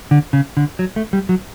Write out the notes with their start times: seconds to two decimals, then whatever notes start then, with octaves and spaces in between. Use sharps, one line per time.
0.11 D3
0.33 C#3
0.57 D3
0.79 F#3
0.96 A3
1.13 G3
1.29 F#3